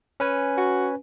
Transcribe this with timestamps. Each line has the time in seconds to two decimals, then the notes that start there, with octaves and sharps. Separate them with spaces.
0.20 C#4 B4 G#5
0.57 F#4